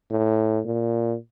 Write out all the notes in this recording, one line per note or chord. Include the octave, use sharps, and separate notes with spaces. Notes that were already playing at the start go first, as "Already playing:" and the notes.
A2
A#2